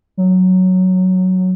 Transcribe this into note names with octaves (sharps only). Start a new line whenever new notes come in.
F#3